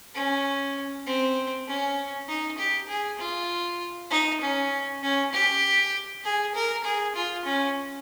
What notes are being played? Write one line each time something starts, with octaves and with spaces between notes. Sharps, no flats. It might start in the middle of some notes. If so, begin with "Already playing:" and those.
C#4
C4
C#4
D#4
G4
G#4
F4
D#4
C#4
C#4
G4
G#4
A#4
G#4
F4
C#4